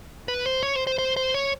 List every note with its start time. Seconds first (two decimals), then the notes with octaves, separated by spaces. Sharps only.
0.28 B4
0.46 C5
0.63 C#5
0.76 C5
0.87 C5
0.98 C5
1.16 C5
1.34 C#5